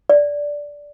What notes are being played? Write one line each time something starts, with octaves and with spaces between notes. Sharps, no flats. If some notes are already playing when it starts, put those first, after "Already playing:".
D5